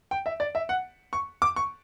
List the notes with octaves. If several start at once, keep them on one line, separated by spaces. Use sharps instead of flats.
G5
E5
D5
E5
F#5
C#6
D6
C#6